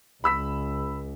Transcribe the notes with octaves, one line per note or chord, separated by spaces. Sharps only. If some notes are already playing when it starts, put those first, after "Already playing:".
C#2 B5 E6 B6